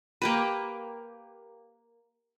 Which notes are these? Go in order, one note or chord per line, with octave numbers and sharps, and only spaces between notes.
A#3 G4 B4